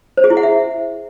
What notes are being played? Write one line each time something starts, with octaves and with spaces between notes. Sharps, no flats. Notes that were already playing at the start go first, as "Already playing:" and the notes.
C5
G#4
E4
F#5
E5